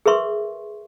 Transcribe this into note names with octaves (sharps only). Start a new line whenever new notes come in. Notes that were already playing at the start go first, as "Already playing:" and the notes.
G#4 A#4 B4 E5 C6 C#6